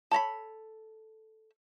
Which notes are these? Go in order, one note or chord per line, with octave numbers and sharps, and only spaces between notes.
A4 C#5 A#5 B5